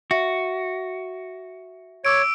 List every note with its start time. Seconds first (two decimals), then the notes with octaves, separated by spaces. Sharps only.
0.11 F#4 E5
2.05 C#5 D6 E6 D7